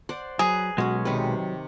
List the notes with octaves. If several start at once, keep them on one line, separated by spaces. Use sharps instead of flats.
C5 D5 F#5
F#3 G#4 B4 A#5
B1 F#3 G#3 C#4 F#4
C3 D#3 F#3 B4